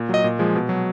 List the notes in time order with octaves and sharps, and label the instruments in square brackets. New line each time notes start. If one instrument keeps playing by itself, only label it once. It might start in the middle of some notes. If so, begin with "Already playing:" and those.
Already playing: [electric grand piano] A#2
F#3 D#5
A#2
F3 G#3
B2
F#3